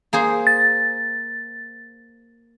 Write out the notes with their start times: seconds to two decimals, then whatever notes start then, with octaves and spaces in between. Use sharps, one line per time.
0.13 A#3 G#4 C5
0.47 A6